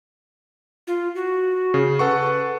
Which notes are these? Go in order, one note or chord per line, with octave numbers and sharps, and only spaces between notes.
F4
F#4
C#3
A4 B4 F#5 C#6